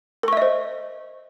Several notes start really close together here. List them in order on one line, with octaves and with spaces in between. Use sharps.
A#4 C#6 E5 D#5 C5